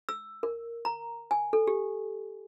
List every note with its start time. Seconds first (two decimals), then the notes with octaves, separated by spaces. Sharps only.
0.09 E6
0.43 A#4
0.85 A#5
1.31 G#5
1.53 A4
1.67 G4